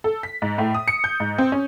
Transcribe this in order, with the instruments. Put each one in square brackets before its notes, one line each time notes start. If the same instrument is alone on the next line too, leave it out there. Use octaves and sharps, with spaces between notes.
[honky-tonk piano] A4
B6
G#2
A2
D#6
C#7
G6
G#2
C4
C#4